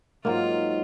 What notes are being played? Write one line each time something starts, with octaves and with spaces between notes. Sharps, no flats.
G#2 F#3 A#3 F4 D6